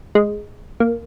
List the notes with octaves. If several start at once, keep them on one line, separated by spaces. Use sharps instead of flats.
G#3
A#3